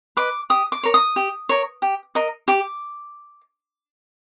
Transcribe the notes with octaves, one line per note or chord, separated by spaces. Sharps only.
B4 D#5 D6
G4 D#6
D6
A#4 C#5
D#6
G4
A#4 C#5
G4
A#4 D#5
G4 D6